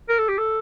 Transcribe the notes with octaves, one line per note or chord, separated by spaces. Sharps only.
A#4
A4
G4
A4